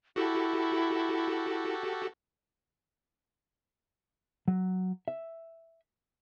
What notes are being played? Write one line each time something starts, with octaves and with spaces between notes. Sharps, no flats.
E4 F#4 G4 A4
F#3
E5